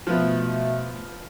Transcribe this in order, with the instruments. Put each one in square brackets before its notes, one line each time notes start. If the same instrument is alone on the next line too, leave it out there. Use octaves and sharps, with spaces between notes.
[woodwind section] B2 A3 [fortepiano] F3 B3